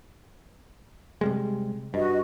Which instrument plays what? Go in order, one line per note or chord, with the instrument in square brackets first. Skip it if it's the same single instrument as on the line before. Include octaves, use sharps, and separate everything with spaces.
[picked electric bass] C3 G3 G#3
[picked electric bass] G2 [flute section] F#4 D#5